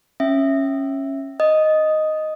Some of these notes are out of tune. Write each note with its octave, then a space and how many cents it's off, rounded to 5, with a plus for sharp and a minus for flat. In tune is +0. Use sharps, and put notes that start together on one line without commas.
C#4 -15 E5 +0
D#5 +0 D#6 +0